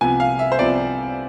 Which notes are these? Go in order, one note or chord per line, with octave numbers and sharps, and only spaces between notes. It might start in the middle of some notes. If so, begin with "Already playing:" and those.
C2 C3 F3 B3 G#5
F5
E5
C5
C2 C3 F3 B3 D5